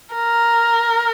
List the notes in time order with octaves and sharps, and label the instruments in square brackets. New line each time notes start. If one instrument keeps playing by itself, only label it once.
[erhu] A#4